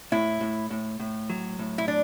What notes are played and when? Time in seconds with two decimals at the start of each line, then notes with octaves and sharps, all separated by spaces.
0.12 A2 E4
0.41 A2
0.70 A2
1.00 A2
1.30 F#3
1.59 A2
1.78 E4
1.88 D4